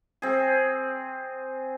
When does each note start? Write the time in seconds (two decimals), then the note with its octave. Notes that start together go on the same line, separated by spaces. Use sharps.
0.22 C4 G#4